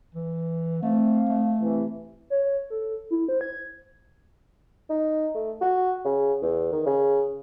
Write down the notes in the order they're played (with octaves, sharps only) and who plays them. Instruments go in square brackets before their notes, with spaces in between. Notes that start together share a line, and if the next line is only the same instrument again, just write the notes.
[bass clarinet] E3
[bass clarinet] A3 [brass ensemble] C4 F5
[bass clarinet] A3
[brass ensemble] C3 E3
[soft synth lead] C#5
A4
E4
C5
G#6
[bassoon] D#4
A3
F#4
C#3
E2
D#3
C#3